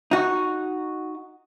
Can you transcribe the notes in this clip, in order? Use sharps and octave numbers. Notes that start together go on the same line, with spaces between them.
D#4 F#4